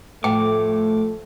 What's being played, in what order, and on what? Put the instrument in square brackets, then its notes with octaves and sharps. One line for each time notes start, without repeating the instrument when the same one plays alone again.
[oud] A2 [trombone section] F3 A3 [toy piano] G5 [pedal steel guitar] D6